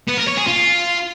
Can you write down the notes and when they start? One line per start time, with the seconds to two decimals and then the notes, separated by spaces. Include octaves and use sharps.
0.08 B3
0.18 A#4
0.28 C#5
0.37 G#4
0.47 F4